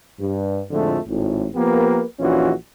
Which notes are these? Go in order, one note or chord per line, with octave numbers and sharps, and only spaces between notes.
G2
F2 A2 D3 F3 G#3 A3
G#1 A2
F3 A#3 B3 G4 A#4 B4
A#1 E3 C#4 D#4 F4 F#4